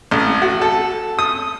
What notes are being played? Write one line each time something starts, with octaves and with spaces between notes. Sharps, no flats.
A1
F#4
A4
D#6